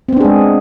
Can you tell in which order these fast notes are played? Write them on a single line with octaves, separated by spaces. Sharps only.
C4 B3 D4 G#4 G#3